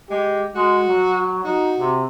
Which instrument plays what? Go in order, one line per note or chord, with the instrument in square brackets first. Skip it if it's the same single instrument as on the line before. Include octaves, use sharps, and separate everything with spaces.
[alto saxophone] G#3 [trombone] G4
[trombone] G#3 [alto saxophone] F#4
[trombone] F#3
[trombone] D#4 [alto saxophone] F#4
[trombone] C3